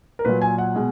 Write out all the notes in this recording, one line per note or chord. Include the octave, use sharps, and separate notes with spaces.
A#4
A#2 F#3 B4
G#5
F#5
B2 G#3